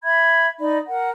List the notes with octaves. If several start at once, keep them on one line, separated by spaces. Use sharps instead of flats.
E5 B5 G#6
D#4 D5 B5
A#4 F#5